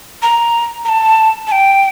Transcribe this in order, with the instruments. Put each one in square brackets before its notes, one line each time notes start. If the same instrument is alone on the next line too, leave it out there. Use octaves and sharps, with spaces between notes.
[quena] A#5
A#5
A5
A5
G5